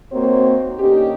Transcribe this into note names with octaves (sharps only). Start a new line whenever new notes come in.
D#3 A#3 C4 F#4 C5 C#5
D3 A#3 C#4 D#4 G4